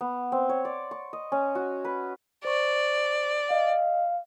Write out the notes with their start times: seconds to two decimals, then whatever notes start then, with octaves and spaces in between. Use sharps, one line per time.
0.01 B3
0.32 C4
0.49 C#5
0.65 D5
0.91 C#6
1.13 D#5
1.32 C#4
1.55 F#4
1.85 B4
2.45 C5 D5 C#6
3.51 D#5 F5